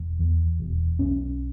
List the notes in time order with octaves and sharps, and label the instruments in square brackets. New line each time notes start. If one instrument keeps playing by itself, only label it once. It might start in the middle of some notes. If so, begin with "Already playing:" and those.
Already playing: [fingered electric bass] E1
E2
E1
B1 C#4